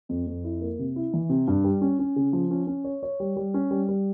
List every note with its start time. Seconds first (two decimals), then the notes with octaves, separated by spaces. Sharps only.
0.09 F2
0.27 F2
0.44 E4
0.61 A#3
0.79 C3
0.96 E4
1.13 E3
1.30 C3
1.47 G2
1.64 G3
1.81 C#4
1.99 C#4
2.16 C#3
2.33 F3
2.51 C#4
2.67 C#4
2.84 C#5
3.03 C#5
3.20 G3
3.36 G3
3.54 C#4
3.71 G3
3.89 G3